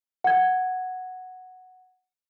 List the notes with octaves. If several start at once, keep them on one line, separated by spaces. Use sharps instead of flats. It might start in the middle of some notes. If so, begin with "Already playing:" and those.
F#5 G#6